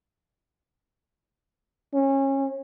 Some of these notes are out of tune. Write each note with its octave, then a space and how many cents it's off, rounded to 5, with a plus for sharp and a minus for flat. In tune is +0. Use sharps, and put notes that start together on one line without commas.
C#4 -25